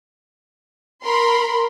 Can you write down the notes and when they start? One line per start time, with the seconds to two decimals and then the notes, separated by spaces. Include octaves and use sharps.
1.05 A#4 B5 C6